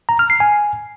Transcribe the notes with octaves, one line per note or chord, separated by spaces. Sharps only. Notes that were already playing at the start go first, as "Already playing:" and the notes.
A#5
F6
C7
G#5